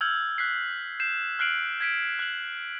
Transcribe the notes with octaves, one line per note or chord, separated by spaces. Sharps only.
E6 F6 G6 G#6 F#7
F#6 B6 C7
G6 C7 E7
F6 F#6 C7 D7 F#7
G#6 B6 D7
F#6 F#7